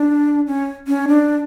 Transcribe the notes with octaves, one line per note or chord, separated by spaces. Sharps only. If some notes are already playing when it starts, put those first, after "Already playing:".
Already playing: D4
C#4
C#4
D4